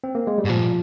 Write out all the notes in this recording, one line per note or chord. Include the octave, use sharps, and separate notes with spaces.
C4
A#3
G#3
G3
G#2
A#2 F3